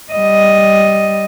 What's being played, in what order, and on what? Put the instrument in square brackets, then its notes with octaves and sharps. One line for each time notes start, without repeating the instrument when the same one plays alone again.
[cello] G3 D#5